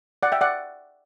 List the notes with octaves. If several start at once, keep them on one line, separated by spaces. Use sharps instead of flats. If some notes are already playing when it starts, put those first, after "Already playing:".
D5 F#5
E5 G5
D5 F#5